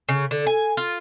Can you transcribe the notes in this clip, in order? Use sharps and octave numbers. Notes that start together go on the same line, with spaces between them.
C#3
D3
G#5
F4